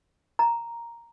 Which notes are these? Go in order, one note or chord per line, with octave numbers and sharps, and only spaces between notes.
A#5